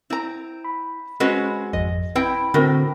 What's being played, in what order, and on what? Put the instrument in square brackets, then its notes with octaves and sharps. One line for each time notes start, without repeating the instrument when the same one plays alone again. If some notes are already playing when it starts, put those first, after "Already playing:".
[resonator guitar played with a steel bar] C4 [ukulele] E4 A#5
[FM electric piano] B5
[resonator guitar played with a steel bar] G#3 C4 F#4 [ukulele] C#4 B4 D#5
[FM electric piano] G#1 F2 [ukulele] D#5
[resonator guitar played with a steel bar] C4 E4 G5 [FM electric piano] B4
[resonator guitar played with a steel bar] A2 [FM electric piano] D3 C4 [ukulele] F#4 A#4 G5